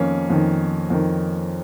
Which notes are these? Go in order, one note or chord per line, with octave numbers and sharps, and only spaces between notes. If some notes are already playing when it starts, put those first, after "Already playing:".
Already playing: F2 D#3 A#3 C#4
F2 D#3
F2 D#3